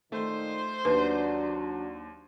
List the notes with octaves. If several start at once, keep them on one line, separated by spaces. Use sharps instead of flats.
A#2 D#3 A3 C5
D#2 F#3 D4 B4